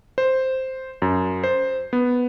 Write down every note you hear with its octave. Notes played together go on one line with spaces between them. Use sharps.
C5
F#2
C5
B3